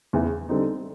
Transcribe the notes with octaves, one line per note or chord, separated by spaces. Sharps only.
E2 C#3 E3
D3 G3 C4 D#4